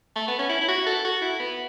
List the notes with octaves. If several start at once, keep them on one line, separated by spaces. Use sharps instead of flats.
A3
B3
C#4
E4
E4
F#4
A4
F#4
E4
B3